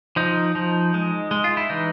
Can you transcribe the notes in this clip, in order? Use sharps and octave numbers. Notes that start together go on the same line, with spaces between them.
F3 D#4
F3
G#3
G#3
F4
E4
E3 D#4